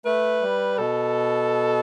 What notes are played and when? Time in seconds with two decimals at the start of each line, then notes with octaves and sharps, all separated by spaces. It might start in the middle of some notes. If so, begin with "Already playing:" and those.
0.05 A3 B4
0.42 G3
0.78 B2 A4